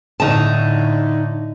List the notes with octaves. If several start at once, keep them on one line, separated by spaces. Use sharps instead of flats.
A2 D3 D#4 A5